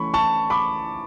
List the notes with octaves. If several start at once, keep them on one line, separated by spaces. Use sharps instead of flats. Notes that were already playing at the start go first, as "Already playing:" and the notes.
Already playing: E3 A3 C#4 B5 C#6
A5 C#6
B5 D6